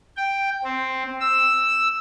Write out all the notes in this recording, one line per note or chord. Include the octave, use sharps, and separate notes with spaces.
G5
C4
E6